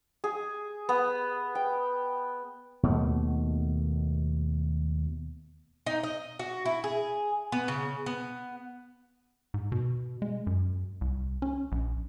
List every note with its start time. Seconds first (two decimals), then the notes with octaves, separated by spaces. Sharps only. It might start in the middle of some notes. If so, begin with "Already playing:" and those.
0.24 G#4
0.89 B3
1.55 G5
2.83 D#2 B2 A3
5.86 D#4
6.03 D#5
6.39 F#4
6.66 E4
6.84 G#4
7.52 B3
7.68 C#3
8.06 B3
9.54 G#2
9.72 B2
10.22 G#3
10.47 F#2
11.01 C2
11.42 C#4
11.72 A#1